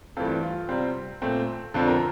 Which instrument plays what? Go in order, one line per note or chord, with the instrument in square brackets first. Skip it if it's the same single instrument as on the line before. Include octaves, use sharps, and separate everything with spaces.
[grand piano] G2 E3 A3 C4 F4 A4
F4
C3 G3 C4
A#2 A3 C4
F2 D3 F3 C4 A4
A#4